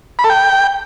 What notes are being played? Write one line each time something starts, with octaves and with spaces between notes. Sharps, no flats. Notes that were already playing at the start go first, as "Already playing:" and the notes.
B5
A4
G5